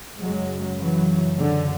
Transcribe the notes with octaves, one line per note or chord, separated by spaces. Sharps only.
F#2 C#3 F#3 G#3
E3 F#3
D3